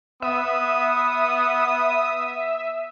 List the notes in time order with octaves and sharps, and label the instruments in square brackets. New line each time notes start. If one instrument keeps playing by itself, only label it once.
[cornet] B3 [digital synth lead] E5 [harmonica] D#6